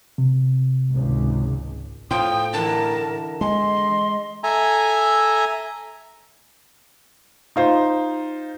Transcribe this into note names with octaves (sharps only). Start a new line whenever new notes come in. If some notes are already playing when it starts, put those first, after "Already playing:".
C3
G#1 C#2
A2 F4 C5 G5 D#6
D3 E3 A#4 A5
G#3 D#5 C6
A4 E5 G#5 A#5
D#4 F4 C5